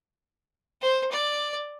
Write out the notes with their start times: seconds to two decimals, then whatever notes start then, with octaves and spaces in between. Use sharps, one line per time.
0.82 C5
1.11 D5